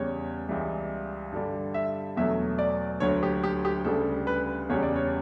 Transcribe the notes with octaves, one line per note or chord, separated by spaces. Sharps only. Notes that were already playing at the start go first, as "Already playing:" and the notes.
Already playing: E2 C#3 G3 C#5
C#2 C#3 E3 G3
G2 D3 G3
E5
E2 B2 F#3 A3 E5
D5
D2 D3 F#3 C#5
G4
G4
G4
D2 C#3 G3 A4
B4
E2 C#3 G3 C#5
D5
C#5